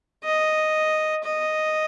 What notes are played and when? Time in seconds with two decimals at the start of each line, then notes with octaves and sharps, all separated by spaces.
0.24 D#5
1.24 D#5